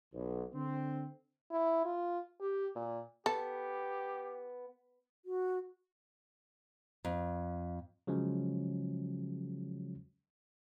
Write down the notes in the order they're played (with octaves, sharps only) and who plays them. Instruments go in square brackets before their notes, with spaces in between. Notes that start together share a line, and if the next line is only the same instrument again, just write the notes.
[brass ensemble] B1
D3 C4
[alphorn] E4
F4
G4
A#2
[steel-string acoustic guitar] B3 [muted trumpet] G4 [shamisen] A4
[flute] F#4
[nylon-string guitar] F2
[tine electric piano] C#3 F3 F#3 G#3 C#4